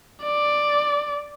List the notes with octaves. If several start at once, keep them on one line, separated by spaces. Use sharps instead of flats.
D5